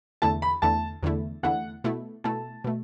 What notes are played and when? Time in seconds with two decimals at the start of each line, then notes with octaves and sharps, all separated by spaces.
0.22 E2 D3 A3 E4 A5
0.42 B5
0.62 E2 D3 A3 E4 A5
1.03 E2 D3 A3 E4
1.43 E2 D3 A3 E4 F#5
1.84 B2 A3 E4
2.24 B2 A3 E4 A5
2.64 B2 A3